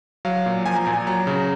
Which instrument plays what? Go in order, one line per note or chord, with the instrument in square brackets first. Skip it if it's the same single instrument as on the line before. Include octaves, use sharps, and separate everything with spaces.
[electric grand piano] F#3 F5
A#2
F3 G#5
A#5
A#2 G#5
F#3 A#5
C#3